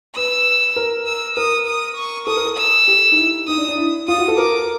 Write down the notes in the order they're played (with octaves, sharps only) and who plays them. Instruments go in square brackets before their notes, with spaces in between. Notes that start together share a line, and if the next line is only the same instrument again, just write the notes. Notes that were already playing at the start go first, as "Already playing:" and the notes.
[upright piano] B4 [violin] E6
[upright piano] A#4
[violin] E6
[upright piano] A#4 [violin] D#6
[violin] D#6
C#6
[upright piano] A4 [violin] D#6
[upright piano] A#4
A4
[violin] E6
[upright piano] G4
D#4
E4
[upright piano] D#4 [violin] D#6
[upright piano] D4
D4
E4
[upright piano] F4 [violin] D#6
[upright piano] F#4
A4
[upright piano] A#4 [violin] D6